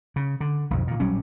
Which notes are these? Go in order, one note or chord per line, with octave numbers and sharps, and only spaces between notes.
C#3
D3
B1 F2 G#2
A#2 D#3
A#1 F#3 G3 C#4